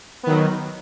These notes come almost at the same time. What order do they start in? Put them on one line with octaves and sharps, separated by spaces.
B3 D#3 F#3